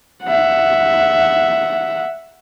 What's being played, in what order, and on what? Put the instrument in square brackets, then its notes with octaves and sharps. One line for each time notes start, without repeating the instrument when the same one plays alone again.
[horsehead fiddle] E5 F#5